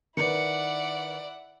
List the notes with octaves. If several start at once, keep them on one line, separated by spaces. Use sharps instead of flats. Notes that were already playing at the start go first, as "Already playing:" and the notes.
D#3 E4 B4 D5 F#5 C#7